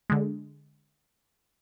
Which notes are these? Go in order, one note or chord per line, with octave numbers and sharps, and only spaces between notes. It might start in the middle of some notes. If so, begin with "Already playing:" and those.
D3 G#3